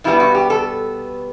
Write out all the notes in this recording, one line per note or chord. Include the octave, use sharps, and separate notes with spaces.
B2 G3 B3 E4
F#4
G4
A4